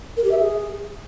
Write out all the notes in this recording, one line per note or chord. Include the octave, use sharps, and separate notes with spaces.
A#4
G4
E5
G#4